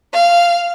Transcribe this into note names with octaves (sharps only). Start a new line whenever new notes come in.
F5